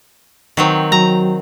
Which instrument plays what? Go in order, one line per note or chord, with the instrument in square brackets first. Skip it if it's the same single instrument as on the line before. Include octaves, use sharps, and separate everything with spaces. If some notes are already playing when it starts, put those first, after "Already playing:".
[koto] D#3 F#3 C4
[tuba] F#3 [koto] A#5